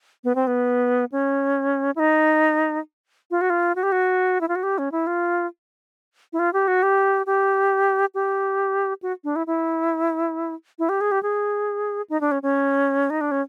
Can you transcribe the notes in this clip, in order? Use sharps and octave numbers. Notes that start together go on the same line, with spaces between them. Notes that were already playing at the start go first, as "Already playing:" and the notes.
B3
C4
B3
C#4
E4
D#4
F4
F#4
F4
F#4
G4
F#4
E4
F4
F#4
G4
C#4
E4
F4
E4
F4
G4
F#4
G4
G4
G4
F#4
D4
E4
E4
E4
G4
G#4
G4
G#4
D#4
D4
C#4
C#4
D#4
D4
C#4